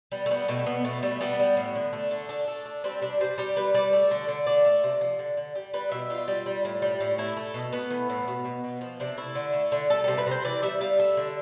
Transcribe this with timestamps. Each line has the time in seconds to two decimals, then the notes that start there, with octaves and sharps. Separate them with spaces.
0.12 G3 B3
0.26 A3
0.31 G3 B3
0.48 B2 A3
0.66 B2 B3
0.84 B2 A3
1.03 G3 A3
1.21 G3 B3
1.40 G3
1.57 A2
1.75 D3
1.93 A3
2.11 D3
2.29 A3 D4
2.48 A3
2.65 A3
2.84 G3 C4
3.01 C3 D4
3.21 G3 C5
3.38 G3 G4
3.56 G3 B4
3.74 G3 D5
3.93 A3
4.11 D3
4.28 D3
4.47 A3 D5
4.65 A3
4.84 C3
5.01 F3
5.19 D3
5.37 D3
5.55 G3
5.74 G3 B4
5.92 B2 E5
6.10 G3 F4
6.28 G3
6.46 G3
6.65 A2
6.82 G3
7.00 A2
7.18 A3 E4
7.37 A3
7.54 B2
7.73 A3 B3
7.91 E3
8.10 A2
8.28 B2
8.45 B2
8.64 B2
8.81 F3
9.00 C3 D4
9.17 A3 E4
9.35 D3
9.54 A3
9.72 D3
9.90 G3 A4
10.04 C3 A4
10.18 B4
10.27 C3 C5
10.44 E3 D5
10.63 G3 E5
10.81 G3 F5
10.99 A3 E5
11.17 D3